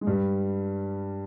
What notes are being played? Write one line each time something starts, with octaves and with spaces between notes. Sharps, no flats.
G#3
G2 G3